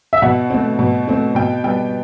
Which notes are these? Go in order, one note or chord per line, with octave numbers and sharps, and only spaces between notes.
E5
B2 F#5
A3 C4
B2
A3 C4
B2 G5
G3 B3 G5